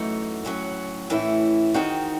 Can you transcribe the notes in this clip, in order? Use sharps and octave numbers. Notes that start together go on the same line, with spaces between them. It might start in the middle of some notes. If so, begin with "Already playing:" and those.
Already playing: F#2 E3 A3 D#4 F#4
A2 F#3 C#4 F#4
A2 E3 A3 C#4 E4
D#3 G#3 C4 D#4 F#4